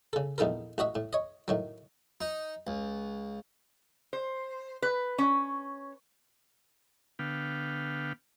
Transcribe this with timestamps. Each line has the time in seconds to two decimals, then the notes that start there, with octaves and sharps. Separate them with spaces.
0.13 C#3 A4
0.38 A#1 E2 D#4 A4 A#4
0.78 A1 F#4 D#5 E5
0.95 A2
1.13 C#5 D#5
1.48 A2 D#3 F#3
2.21 D#4
2.67 C#2
4.13 C5
4.82 B4
5.18 C#4
7.19 D3 B3 F5 G5